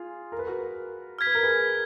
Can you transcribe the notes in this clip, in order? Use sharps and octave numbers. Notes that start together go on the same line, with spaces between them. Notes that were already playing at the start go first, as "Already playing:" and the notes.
Already playing: F4 G#4
A#4
B4
F#4 A#4
F6 G#6 B6
B4
A#4
G#4 B4